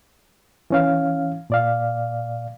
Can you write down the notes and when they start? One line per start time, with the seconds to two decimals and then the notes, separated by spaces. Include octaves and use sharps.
0.70 E3 C#4 F5
1.50 A#2 D5 F5